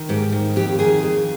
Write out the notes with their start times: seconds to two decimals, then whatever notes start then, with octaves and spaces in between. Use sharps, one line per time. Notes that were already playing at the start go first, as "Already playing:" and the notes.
Already playing: D#3
0.09 G#2 G4
0.32 D#3
0.56 F2 G4
0.79 D#3 G#4
1.03 F2